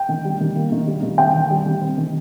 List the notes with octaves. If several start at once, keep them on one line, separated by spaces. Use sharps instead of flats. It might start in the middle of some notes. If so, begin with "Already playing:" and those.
Already playing: G5
D#3
G3
D#3
A#3
D#3
G3
D#3
C4 G5
D#3
G3
D#3
C4
D#3